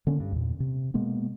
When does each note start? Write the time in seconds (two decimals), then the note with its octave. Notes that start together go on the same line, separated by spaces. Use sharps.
0.07 D3 A#3 C#4
0.20 G2
0.32 E2 A#2
0.60 C3
0.94 B2 G#3 A#3 B3